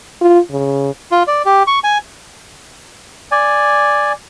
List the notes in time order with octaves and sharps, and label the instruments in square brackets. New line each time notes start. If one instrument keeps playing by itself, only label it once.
[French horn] F4
C#3
[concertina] F4
D5
G4
C#6
G#5
[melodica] D5 G#5